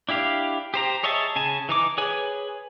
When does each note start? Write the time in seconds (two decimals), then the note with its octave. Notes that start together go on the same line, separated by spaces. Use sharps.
0.09 D4 E4 G4 F5
0.74 G4 C5 A#5
1.03 G#4 C#5 D#5 E5 A5
1.36 C#3 G#5 A5
1.69 E3 D#4 D6
1.98 G#4 B4 C#5 G#5